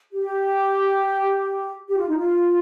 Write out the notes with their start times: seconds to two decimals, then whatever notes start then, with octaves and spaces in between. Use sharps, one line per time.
0.12 G4
1.89 G4
1.97 F4
2.08 D#4
2.18 F4